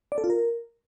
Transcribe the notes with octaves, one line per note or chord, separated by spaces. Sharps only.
D5
A4
F4
A#4